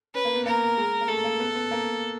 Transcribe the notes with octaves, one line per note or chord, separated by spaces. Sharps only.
C#4 B4
A#3
B3
A#3 A#4
G#3
A#3
A3 A4
A#3
B3
B3
A#3